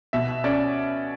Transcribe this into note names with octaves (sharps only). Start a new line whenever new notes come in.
B2 E5
C#4 D5